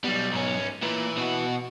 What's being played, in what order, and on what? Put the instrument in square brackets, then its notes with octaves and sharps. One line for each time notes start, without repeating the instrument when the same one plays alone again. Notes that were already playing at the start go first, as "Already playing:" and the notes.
[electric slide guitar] F#3 B3 [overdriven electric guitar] G3
[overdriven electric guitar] G#2 C#4
[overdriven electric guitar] A#2 [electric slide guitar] E4 B4
[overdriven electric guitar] B2 F#4